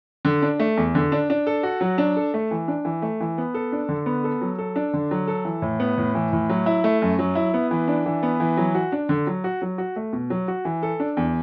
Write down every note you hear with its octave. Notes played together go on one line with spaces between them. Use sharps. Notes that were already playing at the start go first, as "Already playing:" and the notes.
D3
D4
A3
E2
D3
D4
D4
A4
F#4
F#3
D4
A4
A3
E3
D4
E3
A3
E3
B3
A4
D4
D3
B3
A4
F#3
A4
D4
D3
F#3
A4
E3
A2
B3
A2
E3
A2
F#3
E4
A3
F#2
F#3
E4
B3
E3
D4
E3
B3
E3
F#3
F#4
D4
D3
F#3
F#4
F#3
F#4
A3
B2
F#3
F#4
E3
A4
D4
E2